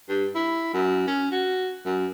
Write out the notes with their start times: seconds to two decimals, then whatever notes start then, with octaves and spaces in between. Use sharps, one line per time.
0.09 G2
0.35 E4
0.74 F#2
1.07 C#4
1.31 F#4
1.85 F#2